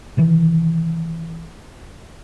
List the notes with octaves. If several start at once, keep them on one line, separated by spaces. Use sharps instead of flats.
C3 D#3 E3